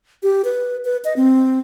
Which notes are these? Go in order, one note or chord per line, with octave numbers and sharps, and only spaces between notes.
G4
B4
B4
D#5
C4